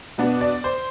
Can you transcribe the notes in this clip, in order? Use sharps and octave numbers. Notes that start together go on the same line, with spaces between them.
B2 B3 D4
D5
C5